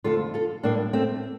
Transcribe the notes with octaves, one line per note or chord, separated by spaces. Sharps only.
F2 D3 A3 F4 A4
F4 A4
A2 G3 A#3 D4
A3 C4